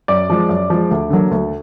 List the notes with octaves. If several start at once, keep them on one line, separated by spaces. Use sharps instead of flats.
F#2 D5
F3 G#3
F#2
F3 G#3
D2
D3 F#3 A#3
D2